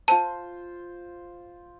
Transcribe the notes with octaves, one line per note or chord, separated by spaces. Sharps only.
F4 C5 A5